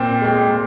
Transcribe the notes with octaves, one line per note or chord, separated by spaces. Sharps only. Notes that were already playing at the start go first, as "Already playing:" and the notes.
Already playing: A#2 C4
G#3 C4
A#2